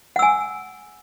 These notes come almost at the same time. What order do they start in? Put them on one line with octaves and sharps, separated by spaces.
F#5 E6 G#5